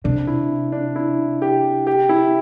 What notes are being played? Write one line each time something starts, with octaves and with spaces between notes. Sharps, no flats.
C3 D4
E4
D4
E4
G4
G4
E4